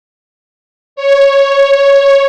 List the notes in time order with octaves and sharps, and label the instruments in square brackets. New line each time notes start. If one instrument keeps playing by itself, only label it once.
[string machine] C#5